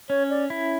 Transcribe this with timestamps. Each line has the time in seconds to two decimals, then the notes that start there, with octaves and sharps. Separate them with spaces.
0.09 C#4 C#5
0.30 D5
0.50 E4